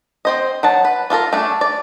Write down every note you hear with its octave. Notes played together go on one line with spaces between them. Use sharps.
C4 C5 D#5
F#3 F#5 A5
B4
D4 F4 A4 A#4
A3 D4 G#4
D5